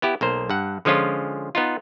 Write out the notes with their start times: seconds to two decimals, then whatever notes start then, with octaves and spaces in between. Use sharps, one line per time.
0.02 B3 E4 G4
0.21 B1 A#3 C5
0.50 G2 F#5
0.85 D3 F3 G#3 C#4 F4
1.55 B3 D#4 F4